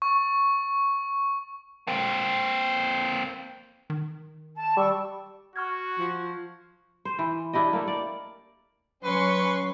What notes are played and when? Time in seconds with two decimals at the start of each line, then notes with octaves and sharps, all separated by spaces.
0.02 C#6
1.87 A#3 C4
3.90 D#3
4.55 A5
4.77 G3 C#6 D6 E6
5.56 F#4 C#6 F6 G#6
5.99 F3
7.05 C5
7.19 E3
7.53 D4 E4 G4 D#5
7.73 A3 A#3
7.88 D5
9.04 F#3 C#4 B4 C6 C#6